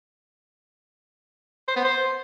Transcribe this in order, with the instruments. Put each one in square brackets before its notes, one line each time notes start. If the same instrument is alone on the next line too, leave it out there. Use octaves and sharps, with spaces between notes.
[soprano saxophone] C5
B3
C5